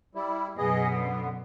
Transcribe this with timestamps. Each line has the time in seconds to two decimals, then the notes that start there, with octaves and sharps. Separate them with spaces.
0.15 G3 E4
0.58 F#2 B2 B3 G#4 D#5
0.90 D3 B3